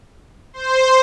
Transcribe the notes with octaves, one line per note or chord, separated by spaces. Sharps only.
C5